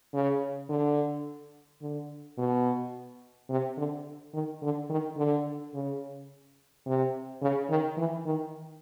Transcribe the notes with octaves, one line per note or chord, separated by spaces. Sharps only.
C#3
D3
D3
B2
C3
D3
D#3
D3
D#3
D3
C#3
C3
C#3
D#3
E3
D#3